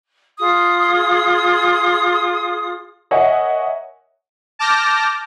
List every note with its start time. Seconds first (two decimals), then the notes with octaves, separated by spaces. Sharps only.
0.38 F4 G#4 D#6
3.11 A#4 C#5 D#5 E5 F#5 G#5
4.59 A5 D6 F6 G6 A#6